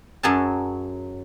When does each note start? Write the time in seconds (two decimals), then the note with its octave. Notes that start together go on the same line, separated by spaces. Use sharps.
0.23 F#2 F#3 G#4 G#5 A5